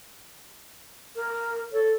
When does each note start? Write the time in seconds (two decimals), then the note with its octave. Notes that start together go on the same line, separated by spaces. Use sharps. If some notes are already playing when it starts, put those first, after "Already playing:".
1.16 A#4
1.72 A4 C#5